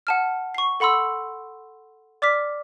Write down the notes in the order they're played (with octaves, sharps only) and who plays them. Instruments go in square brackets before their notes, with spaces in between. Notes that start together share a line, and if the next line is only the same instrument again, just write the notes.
[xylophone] F#5 A5 F6
C#6 C7
A4 F#5 B5 C6 E6
D5 D6 F6 B6